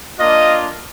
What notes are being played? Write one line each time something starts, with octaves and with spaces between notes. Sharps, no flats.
A#3 D4 F4 D#5